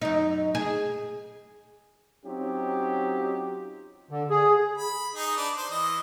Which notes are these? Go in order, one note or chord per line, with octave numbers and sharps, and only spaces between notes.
F#2 D#4
G#4
F#3 C4 C#4 D#4 F4 G4
D3
G#4
B5
D#4 G#4
D4 B4 D5
C5
E3 D#5